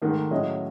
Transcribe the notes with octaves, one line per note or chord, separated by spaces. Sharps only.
G#2 D#3 A3
A2 F#3 C#4 G#4 D#5